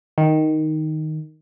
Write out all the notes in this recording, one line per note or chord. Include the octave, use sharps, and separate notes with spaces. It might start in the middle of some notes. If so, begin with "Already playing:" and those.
D#3